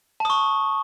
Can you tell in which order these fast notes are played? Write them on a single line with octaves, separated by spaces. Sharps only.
A5 D#6 C#6